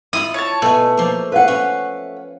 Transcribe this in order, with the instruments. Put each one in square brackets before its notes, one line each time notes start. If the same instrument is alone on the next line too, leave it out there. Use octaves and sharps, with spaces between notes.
[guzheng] E4 F4 B5 [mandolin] D#6
[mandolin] C#5 A5
[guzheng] B2 G#5 [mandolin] A3
[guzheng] F3 A#3
[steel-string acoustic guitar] B4 F5 F#5
[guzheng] C#4 B5